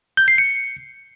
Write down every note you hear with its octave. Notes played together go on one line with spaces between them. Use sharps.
G6
C7
C#7